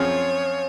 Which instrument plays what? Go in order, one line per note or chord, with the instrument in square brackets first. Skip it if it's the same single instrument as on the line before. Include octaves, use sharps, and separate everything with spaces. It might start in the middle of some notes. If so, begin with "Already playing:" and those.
Already playing: [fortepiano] F#2 F3 C4 F4 G#4 [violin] C#5